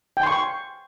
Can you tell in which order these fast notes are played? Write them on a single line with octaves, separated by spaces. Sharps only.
G5 G#5 C6 C#6